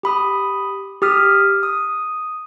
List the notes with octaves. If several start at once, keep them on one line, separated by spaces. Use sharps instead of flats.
G4 B5 D#6
G4 D#6 F6 B6
D#6